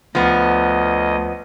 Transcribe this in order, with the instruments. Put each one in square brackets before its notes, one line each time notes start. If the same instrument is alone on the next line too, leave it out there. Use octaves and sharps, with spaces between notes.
[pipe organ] D2 D#5 [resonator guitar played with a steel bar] F3 B3